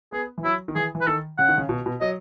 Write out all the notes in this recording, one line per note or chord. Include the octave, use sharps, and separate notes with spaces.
B3 G#4
E3
F#3 E4
D#3
E3 G#4
E3
B4
D#3 A4
C#3 F#5
D#3
C#3
B2
B2
F#3 D#5